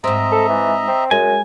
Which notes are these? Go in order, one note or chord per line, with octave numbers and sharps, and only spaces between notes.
G#2 C4 D#5 E5 A#5
A4
E3
C4
F#2 G#3 G#5